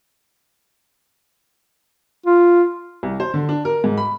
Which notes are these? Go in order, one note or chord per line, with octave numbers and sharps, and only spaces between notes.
F4
C2
C5
D3
D4
A#4
G#2
B5